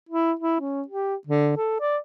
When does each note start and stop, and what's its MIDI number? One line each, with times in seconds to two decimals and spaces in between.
0.09 0.33 64
0.40 0.60 64
0.61 0.83 61
0.88 1.15 67
1.27 1.53 50
1.57 1.77 69
1.80 1.98 74